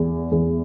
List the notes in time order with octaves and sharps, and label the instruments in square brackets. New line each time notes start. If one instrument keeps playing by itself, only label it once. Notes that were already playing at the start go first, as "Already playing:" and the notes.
Already playing: [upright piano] E2
E2